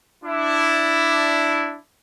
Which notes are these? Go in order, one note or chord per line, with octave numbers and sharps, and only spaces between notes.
D4 E4